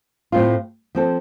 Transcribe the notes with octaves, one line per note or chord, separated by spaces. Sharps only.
A2 A3 C4 F4
F3 C4 A4